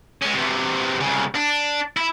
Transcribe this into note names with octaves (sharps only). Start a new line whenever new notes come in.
G#3 C#4
E2 C3
C2 C#3
D4
E4